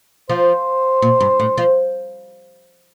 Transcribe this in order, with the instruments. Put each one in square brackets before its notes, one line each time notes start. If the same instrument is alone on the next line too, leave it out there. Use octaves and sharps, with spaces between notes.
[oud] F3 [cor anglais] C5
[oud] A#2
G2
A2
F3